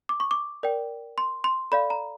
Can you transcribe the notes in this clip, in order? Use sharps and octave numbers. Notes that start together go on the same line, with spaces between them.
D6
C#6
D6
A#4 D5 G5
C6
C6
A4 D5 F5 B5
A#5